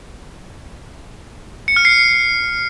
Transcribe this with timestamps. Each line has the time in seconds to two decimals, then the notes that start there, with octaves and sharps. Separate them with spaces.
1.68 C#7
1.76 F6
1.85 C7